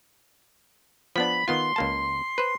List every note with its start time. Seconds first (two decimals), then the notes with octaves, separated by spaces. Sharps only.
1.16 F3 B3 D4 B5
1.48 D#3 B3 F4 C6
1.76 C#2 A#3 A5
2.38 B4 C5